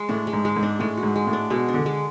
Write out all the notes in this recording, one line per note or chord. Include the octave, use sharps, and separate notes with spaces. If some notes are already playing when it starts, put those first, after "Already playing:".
Already playing: G#3
A2 D4
G#3
G#2
G#3
G#2
D4
A2 G#3
F#4
G#2
G#3
A2
D4
B2 G#3
D4
D3
G#3